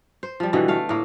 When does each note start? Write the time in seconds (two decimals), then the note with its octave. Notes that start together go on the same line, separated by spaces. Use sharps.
0.23 C5
0.40 F3 G3
0.53 B2 D3 E3 G3
0.68 A3 F5
0.89 A2 A#3